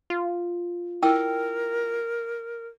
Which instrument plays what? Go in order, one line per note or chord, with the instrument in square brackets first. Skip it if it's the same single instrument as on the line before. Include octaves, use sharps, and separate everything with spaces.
[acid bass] F4
[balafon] E4 [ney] A#4 [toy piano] G5 E6